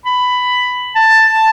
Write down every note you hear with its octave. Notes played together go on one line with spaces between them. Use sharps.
B5
A5